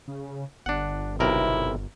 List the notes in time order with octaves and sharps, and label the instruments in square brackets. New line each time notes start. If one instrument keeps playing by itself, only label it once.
[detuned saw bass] C#3
[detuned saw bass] G1 [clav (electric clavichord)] D4 F#5
[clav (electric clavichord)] B1 C3 A#4 [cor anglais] E4